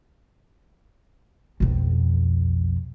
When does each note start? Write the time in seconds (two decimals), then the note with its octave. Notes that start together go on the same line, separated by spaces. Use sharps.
1.60 B1 F2